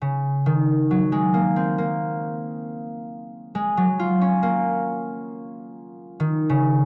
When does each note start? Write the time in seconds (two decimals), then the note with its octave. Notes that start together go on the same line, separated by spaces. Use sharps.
0.02 C#3
0.46 D#3
0.91 F#3
1.12 G#3
1.34 A#3
1.56 C4
1.78 A#3
3.55 G#3
3.77 F#3
3.99 F4
4.21 C#4
4.43 A#3
6.20 D#3
6.49 C#3